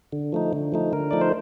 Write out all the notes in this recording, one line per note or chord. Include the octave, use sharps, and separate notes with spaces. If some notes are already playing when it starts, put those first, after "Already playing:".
D3
F3 A3 D#4
D3
F3 A3 D#4
D3 A#4
F3 A3 D#4 D5
C5